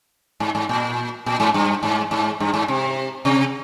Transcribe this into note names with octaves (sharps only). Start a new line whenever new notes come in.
G#2
G#2
A#2
A#2
G#2
G2
G#2
G#2
G2
G#2
C3
C3